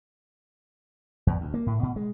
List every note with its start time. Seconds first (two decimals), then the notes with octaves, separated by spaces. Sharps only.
1.27 E2
1.41 D2
1.54 A#3
1.67 A2
1.83 B2
1.96 G#3